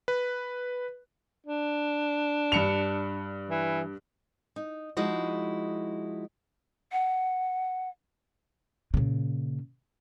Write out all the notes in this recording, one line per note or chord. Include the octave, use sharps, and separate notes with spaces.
B4
D4
G2 C#7 F7
E3
D#4
F3 G#3 D#4 E4 F#4
F#5
A#2 C#3